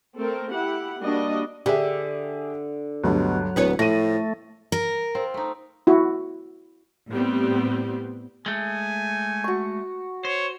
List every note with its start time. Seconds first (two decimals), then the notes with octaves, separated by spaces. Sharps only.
0.17 A3 C4 A4 A#4
0.51 E4 G4 F#5
0.99 G3 A#3 D4 F#4 D#5
1.66 D3 G4 G#4 E5
3.04 D2 G2 B2 F#3
3.56 D1 E2 B3 B4 C#5
3.79 A2 F3 A3 A#6 D#7
4.72 A#4
5.15 C4 F4
5.34 A3 D#4
5.87 E4 F#4
7.12 A2 G3 B3 C4
8.46 G#3 A3 G#5
9.44 F#4 C#6
10.25 C5 C#5